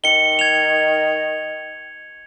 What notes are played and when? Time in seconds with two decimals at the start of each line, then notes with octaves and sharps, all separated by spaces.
0.04 D#3 C#7 G7
0.39 G#6 F7